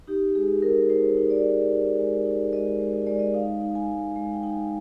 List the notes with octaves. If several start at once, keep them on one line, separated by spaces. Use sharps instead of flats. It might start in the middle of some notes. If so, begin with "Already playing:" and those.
D#4 G4
G#3 G#4
D#4 A#4
D#4 C5
D#4
D5
D#4
D#4
G#3
D#4
G#3 D#5
G#3
D#5
G#3 D5
D#5
D#4 F5
D#4
G#5
G#3
G#3
G5
D#4 G#5